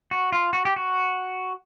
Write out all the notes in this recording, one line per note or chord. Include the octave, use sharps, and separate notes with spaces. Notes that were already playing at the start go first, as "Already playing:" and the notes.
F#4
F4
F#4
G4
F#4